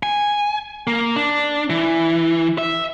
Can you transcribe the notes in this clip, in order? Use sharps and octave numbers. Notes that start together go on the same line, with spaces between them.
G#5
A#3
D4
E3
E5